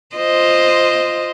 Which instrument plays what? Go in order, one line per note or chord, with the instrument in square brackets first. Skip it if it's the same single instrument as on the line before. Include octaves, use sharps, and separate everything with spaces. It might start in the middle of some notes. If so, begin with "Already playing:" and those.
[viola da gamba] F4 C5 D#5